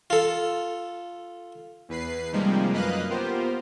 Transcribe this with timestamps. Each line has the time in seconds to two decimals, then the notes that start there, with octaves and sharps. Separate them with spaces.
0.10 F4 A4
1.89 E2 B4 C7
2.32 C3 D#3 F3 G3 G#3 A#3
2.72 F#2 A#3 B4 D#5 F5 F#6
3.10 B3 F4 G4 A#4 C5